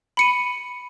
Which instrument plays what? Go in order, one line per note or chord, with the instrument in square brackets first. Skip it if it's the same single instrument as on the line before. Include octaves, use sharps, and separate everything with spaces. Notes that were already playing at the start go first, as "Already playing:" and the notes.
[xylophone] B5 C#7 D#7